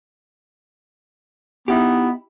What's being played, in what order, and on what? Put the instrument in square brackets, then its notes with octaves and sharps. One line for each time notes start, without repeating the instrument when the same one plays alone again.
[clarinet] B3 [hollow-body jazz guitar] D#4 E4 G4